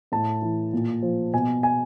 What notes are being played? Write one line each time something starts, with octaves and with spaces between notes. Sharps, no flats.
A2 A5
E3
A#2
F3
B2 G#5
G#5